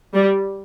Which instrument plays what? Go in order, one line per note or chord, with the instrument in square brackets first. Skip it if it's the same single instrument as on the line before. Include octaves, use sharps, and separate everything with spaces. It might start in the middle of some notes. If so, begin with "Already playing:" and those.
[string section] G3